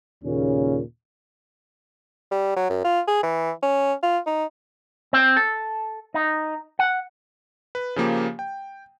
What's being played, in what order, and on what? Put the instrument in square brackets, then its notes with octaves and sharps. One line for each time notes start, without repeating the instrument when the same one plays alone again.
[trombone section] D#2 A#2 C#3 C#4
[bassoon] G3
F#3
F#2
F4
G#4
E3
C#4
F4
D#4
[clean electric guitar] C4
A4
D#4
F#5
[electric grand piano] B4
C#3 F3 A#3 G4
G5